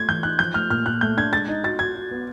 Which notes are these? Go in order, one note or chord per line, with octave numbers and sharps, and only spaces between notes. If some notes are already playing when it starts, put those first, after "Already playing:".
Already playing: A3 G#6
E3 G6
D#4 F#6
F3 G6
A3 F6
A#2 F6
A#2 F#6
A3 G6
D4 G#6
G#3 A6
D#4
F#4 A6
F#4 G#6
F#4
B3